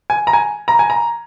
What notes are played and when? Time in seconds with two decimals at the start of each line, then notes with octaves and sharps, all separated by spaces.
0.10 G#5
0.27 A#5
0.33 G#5
0.68 A#5
0.79 G#5
0.90 A#5